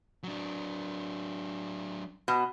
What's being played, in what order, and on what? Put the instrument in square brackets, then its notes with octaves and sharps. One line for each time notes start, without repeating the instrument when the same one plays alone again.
[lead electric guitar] F#3 D4
[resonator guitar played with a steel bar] B2